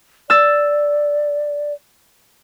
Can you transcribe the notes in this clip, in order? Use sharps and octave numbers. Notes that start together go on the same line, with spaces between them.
D5 E6 A6